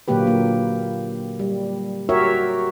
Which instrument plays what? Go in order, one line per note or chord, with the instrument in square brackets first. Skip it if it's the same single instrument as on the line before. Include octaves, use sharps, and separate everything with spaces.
[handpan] A#2 D3 F#3 A#3 G4 B4
A#3
G3
F#4 G4 A#4 C#5 E5